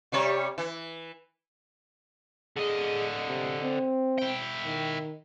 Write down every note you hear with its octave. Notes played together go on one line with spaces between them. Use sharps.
C3 G3 C#5
E3
D3 G#4 D#5
C3
C4
E4 G5
D#3